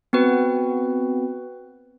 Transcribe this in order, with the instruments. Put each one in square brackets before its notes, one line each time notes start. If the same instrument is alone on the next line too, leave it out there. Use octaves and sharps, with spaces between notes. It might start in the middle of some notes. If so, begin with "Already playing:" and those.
[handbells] B3 C4 F#4 B4